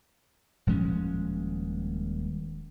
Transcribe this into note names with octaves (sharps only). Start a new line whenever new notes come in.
D#1 F3 G#3 C#4